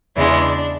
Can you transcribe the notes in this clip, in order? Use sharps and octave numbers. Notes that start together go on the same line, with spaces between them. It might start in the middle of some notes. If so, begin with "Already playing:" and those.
E2 C#3 E3 G#3 D4